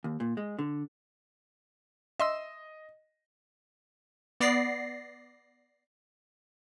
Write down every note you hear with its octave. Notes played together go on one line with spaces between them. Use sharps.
D#2
A#2
G#3
D3
D#5 E5 C6 E6
B3 D5 A#6 C7